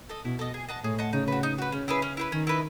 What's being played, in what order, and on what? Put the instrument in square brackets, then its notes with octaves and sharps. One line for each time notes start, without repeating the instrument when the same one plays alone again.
[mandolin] A4 D#5
[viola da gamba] B2 [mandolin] E4
[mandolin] A4 D#5
G#4
D#5 F#5 A5
[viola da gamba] A2 [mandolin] G#4
[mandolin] D#5 F#5 A5
[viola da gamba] C#3 [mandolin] D#4
[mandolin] F#4 B4
D#4
F#4 B4
[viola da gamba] C#3 [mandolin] C#4
[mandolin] E4 G#4 B4
C#4
E4 G#4 B4
[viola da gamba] D#3 [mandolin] C#4
[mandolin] E4 B4 D#5